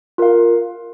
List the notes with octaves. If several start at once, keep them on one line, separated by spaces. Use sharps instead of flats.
F4 A#4 F5